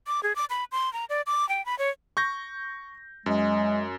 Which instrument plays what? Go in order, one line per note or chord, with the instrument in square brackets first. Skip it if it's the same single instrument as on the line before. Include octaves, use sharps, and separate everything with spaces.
[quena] D6
G#4
D6
B5
C6
A#5
D5
D6
G5
B5
C#5
[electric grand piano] C#6 G6 A#6
[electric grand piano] F#2 [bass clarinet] G#3